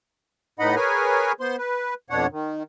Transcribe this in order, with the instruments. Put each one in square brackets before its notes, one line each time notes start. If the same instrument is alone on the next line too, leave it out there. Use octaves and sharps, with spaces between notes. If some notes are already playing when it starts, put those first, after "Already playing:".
[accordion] A2 B3 D#4 D#5 F#5 B5
G#4 A#4 B4 C#5 G#5
B3 C5 C6
B4
F2 B2 D4 C#5 F#5
D#3